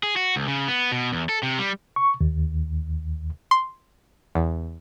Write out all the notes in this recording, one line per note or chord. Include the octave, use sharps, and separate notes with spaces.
G#4
F#4
C#2
C#3
B3
B2
E2
A4
C3
G3
C#6
D#2
C6
E2